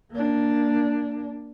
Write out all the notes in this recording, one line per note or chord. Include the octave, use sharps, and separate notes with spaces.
A#3 D4